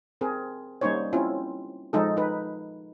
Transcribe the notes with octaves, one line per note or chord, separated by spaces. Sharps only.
C4 G#4 A#4
G3 A#3 C#4 D#4 C5 C#5
C4 C#4 E4 F4
F3 G#3 D#4 A4
D#4 B4